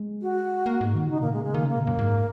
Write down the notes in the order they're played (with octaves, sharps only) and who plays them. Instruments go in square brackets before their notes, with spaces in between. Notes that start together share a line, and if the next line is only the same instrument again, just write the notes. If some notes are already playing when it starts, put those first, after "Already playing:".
Already playing: [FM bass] G#3
[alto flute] F#4
[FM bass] A#3
G#2
D#3
[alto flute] F#4
[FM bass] C#3 [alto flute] D#4
[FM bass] A#2 [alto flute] A#3
[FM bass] C#3 [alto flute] G#3
[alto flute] G#3
[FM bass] D#3 [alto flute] A#3
[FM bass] C#3 [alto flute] A#3
[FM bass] A#2
[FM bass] F#2 [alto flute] A#3
[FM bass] G#2